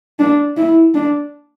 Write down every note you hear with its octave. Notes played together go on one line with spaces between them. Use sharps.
D4
E4
D4